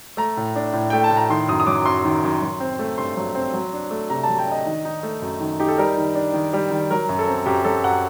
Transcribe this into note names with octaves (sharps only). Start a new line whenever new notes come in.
A3 A#5
A2
D4
A2
A3 G5
A5
A2
A#5
D#3 C6
F#2 D#6
D#6
F#3 D6
F#2 C6
D#3
F#2
F#3
C4
A3
G2 C6
F#3
C4
F#3
D4
A3
C3 A#5
A5
F#3
G5
D4 D#5
D#3
D#4
A3
F#2
D#3
D#4 G4
A4
G3 A#4
D#3
D4
D#3
G3
D#3
F#3 A#4
F#2
A4
C4
F#2 G4
F#3 A4
F#2 F#5